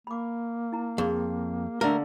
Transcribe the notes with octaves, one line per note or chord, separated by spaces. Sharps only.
A#3 B5 D6
E4 A#5
F2 G#4
D3 A3 A#3 A#4